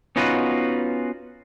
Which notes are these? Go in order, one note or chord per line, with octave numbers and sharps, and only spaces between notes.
B3 C#4 D#4 F4 F#4 B4